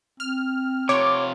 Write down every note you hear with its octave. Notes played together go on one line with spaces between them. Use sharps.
C4 F6
C3 F4 C#5 D6